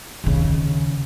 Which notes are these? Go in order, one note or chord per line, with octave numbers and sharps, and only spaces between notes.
D#2 C#3